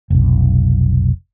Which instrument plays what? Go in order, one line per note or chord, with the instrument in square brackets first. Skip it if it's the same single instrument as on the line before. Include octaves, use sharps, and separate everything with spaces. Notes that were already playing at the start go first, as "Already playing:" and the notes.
[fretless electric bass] F1 B1